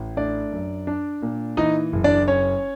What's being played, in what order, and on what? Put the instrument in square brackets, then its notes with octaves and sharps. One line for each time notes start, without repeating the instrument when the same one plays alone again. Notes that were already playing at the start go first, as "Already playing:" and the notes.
Already playing: [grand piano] A1
A3 D4 D5
F#2
D4
A#2
E3 D#4 D#5
F#1
D4 D5
C#4 C#5